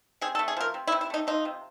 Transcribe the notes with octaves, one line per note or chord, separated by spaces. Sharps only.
C3 G#4
A4
A3
G#4
F3 A#4
C3
E4
C3
E4
A3 D#4
F3 D#4
C3